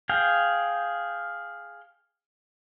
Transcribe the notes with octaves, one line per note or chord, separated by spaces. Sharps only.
G#4 F5 G5